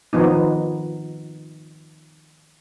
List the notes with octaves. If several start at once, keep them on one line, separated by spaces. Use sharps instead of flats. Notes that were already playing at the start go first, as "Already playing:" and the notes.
D#3 F3 B3 D#4